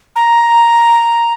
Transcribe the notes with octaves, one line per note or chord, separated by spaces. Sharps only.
A#5